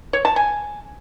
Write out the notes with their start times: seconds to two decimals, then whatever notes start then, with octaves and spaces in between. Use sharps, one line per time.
0.13 C#5
0.25 A5
0.36 G#5